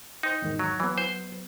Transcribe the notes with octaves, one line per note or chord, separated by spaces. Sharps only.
D#4 C5 G5
E2 G#2 D#3
F#3
E3 F#3 B3
C5